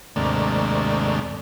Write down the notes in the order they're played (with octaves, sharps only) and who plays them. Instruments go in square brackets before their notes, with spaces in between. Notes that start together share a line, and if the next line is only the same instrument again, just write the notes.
[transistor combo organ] D#2 G#2 C3 A3 A#3 D4